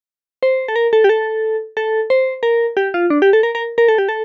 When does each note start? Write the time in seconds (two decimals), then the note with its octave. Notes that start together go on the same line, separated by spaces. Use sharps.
0.43 C5
0.68 A4
0.76 A#4
0.93 A4
1.04 G4
1.09 A4
1.77 A4
2.10 C5
2.43 A#4
2.77 G4
2.94 F4
3.10 D4
3.22 G4
3.33 A4
3.43 A#4
3.55 A#4
3.78 A#4
3.88 A4
3.98 G4
4.09 A4